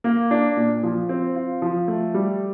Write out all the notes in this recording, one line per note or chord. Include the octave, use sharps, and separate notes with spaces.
A#3
D4
A#2
F3
C4
F4
F3
A3
G3